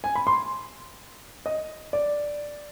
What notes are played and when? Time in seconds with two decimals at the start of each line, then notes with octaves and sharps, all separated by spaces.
0.04 G#5
0.15 B5
0.27 C6
1.46 D#5
1.93 D5